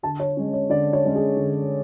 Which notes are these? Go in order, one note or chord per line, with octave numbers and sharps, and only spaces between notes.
D3 A5
C#5
G#3 C#4
C#5
D3 D5
C#5
G#3 C#4
G#4
D3